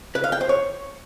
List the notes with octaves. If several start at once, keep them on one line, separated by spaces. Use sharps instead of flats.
B4
F5
G5
C5
C#5